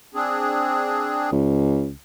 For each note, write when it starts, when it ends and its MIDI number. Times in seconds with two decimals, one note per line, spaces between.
0.15 1.30 60
0.15 1.30 62
0.15 1.30 68
1.32 1.91 37